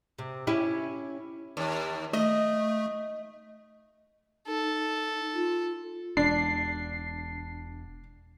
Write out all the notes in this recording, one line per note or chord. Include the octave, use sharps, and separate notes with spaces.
C3
C#4 E4 G4
D#2
A3 D#5
D#4 A4
F4
E1 D4 C7